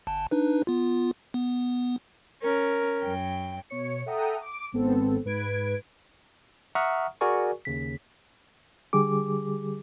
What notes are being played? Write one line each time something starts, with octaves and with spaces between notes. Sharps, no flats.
G1 A5
D4 D#4 B4
B3 F4
B3
C#4 A#4
F#2 G5
B2 C#5 C#7
A4 E5 F#5 G5 A#5 D#6
D6 D7
G#1 G#2 B3 C4 A4
G#2 B4 G#6 D7
E5 F#5 A#5 C#6 D#6 F6
F#4 G#4 A#4 D5 G#5 C#6
D#2 C#3 B6
D3 G3 G4 G#4 D6